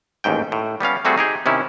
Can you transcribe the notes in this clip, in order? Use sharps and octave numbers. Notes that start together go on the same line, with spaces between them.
A1 D#2 G#2 G5
A2
G3 B3 C#4 F5
G3 A3 C4 F#4 G#4
D#4 G4 G#4
C3 D#3 C#4 E4